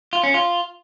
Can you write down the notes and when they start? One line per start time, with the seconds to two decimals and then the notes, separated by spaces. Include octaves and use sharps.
0.13 F4
0.23 C#4
0.34 F4